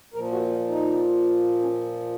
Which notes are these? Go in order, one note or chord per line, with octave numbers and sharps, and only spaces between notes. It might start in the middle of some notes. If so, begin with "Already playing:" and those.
A#2 F3 A#4
F#4
F4
D#4
C#4